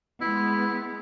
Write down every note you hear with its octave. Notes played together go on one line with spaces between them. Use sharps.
G#3 B3 E4